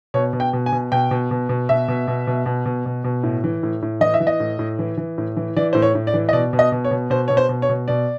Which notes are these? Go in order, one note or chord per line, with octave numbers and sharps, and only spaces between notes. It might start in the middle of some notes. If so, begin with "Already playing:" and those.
B2 C#5
B2
G5
B2
G#5
B2
B2 G5
B2
B2
B2
B2 E5
B2
B2
B2
B2
B2
B2
B2
A2
E3
A2
A2
E3 D#5
E5
E3
D#5
A2
A2
E3
E3
A2
E3
E3 D5
A2 C5
C#5
A2
D5
E3
D#5
B2 D5
B2
D#5
B2
C#5
B2
B2 C5
B2 C#5
C5
B2
C#5
B2
B2 D5